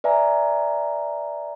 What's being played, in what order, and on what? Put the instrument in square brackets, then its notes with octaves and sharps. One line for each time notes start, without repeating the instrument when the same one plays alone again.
[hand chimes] B4 D5 E5 G#5 A#5